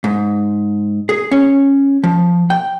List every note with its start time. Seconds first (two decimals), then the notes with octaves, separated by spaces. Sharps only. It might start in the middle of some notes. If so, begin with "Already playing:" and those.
0.04 G#2
1.09 G#4
1.31 C#4
2.04 F3
2.50 G5